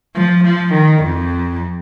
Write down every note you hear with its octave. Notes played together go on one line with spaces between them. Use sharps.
F3
F3
D#3
F2